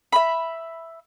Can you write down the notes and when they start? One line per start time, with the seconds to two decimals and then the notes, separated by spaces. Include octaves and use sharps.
0.12 E5 B5